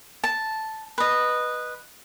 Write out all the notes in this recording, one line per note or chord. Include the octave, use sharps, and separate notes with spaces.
A5
B4 D#5